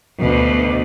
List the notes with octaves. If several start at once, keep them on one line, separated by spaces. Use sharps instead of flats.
D2 B2